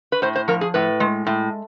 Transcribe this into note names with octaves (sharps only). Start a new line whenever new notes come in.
B4
A2 C5
C5
F3 A#4
G#4
A2 B4
G#3
A2